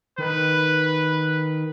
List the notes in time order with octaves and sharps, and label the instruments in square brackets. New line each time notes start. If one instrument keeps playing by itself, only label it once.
[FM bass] D#3 [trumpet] B4